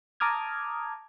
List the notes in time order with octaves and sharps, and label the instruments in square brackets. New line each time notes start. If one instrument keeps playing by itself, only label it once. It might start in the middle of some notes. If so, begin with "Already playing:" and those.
[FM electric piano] A5 A#5 D6 D#6 F6 G#6